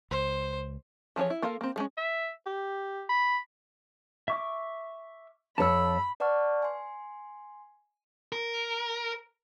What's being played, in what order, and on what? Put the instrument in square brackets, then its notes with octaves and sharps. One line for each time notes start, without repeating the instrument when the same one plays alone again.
[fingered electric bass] C#2 [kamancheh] C5
[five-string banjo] E3 F3 D4 G#4 C#5
E4
A#3 F4 A4 A#4 F5
A#3 C4
G3 G#3 C#4
[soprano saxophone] E5
G4
B5
[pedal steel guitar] E5 C#6 D6
[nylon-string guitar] F2 C#5 [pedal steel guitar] A5 E6 [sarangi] B5
[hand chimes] B4 D5 F#5 A5 C#6 F6
G#5 C6
[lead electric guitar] A#4